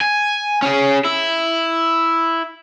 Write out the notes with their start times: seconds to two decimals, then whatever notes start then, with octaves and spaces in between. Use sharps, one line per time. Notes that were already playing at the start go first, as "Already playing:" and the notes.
0.01 G#5
0.62 C#4 G#4
1.04 E4